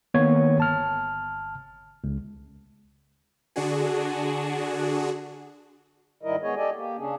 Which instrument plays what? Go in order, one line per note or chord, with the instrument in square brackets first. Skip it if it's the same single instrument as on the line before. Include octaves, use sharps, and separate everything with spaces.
[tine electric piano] D#3 A#3 B3 C#5 G#6
G1 A5 F6
C#2
[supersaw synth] D3 D4 F#4 G#4
[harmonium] G#2 D#3 G3 E4 A#4 D#5
G#3 B3 G#4 C#5 D#5
G4 A4 D5 D#5 G#5
A#3 G4
C#3 C#4 D4 G#4